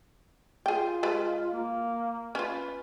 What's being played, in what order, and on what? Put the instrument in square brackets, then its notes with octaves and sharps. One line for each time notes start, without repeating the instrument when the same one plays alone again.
[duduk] F4 [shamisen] G#4 G5
[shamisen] G#3 B4 D#5
[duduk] A#3
[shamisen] C#4 F4 [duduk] B4